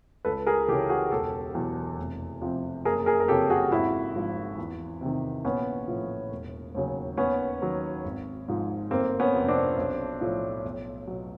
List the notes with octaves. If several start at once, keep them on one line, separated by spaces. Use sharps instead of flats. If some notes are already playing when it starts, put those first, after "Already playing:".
C#2 A4 B4
G#4 A#4
C#3 E3 G4 A4
F#4 G#4
E1 G4 A4
E2 B2 F#3
F1
F2 C3 F3
F#1 G#4 A#4
G#4 A#4
A#4
F2 C#3 F3 G4 A4
F#4 G#4
G#1 E4 F#4
G#2 F3
E2
C3 D#3
A#1 B3 C#4
A2 F3
E1
D#2 C#3 F#3
D#2 B3 C#4
D#3 F#3
G#1
G#2 F3
G1 A#3 C4
B3 C#4
F2 C3
C4 D4
B1
A2 F3
B1
B2 F#3